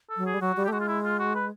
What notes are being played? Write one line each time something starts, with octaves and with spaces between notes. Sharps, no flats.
A4
F#3
G#4
G3
F#3 F#4
G3
G4
A3
G#3 F#4
F4
E4
F4
F#4
B4